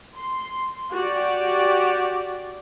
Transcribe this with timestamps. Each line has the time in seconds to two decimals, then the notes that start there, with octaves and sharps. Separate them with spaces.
0.16 C6
0.93 F#4 G4 D5